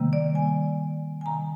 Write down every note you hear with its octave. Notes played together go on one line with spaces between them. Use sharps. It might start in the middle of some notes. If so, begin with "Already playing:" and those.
Already playing: C3 D#3 G3 A#3
D5
G#5
G#5
C3 D#3 G3 A#5